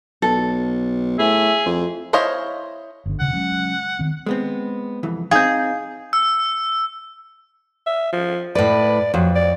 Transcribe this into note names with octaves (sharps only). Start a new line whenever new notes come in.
B1 A4
A2 G#4 E5
F2
E4 C5 C#5 D#5 F5
G1 D3
D#1 C#3 F#5
F#3 G#3 C#4
D#3 C4
G#3 B3 C4
C2 F2 E3
C4 D#4 G#4 F5 G6
E6
E5
F3
A2 B4 D5
F2 F#3
D5